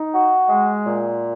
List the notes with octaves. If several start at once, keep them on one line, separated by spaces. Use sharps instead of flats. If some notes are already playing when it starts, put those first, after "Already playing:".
Already playing: D#4
F#4
G#3
A#2